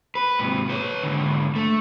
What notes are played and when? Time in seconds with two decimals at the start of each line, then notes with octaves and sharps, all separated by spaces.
0.15 B4
0.39 G#2 C3
0.69 B4 C#5
1.03 G#2 D3
1.55 A3